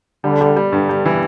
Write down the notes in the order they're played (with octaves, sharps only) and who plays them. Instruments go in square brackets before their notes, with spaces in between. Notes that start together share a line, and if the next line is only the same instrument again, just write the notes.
[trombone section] D3 [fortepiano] G3
[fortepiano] G3
G3
[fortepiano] G2 [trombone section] D3
[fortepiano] G3
E3